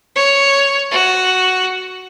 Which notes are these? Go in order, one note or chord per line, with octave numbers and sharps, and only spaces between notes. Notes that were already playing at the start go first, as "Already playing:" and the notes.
C#5
F#4